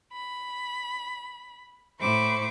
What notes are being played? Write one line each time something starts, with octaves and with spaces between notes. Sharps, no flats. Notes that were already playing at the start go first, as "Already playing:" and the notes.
B5
A2 C5 B5 C#6 D6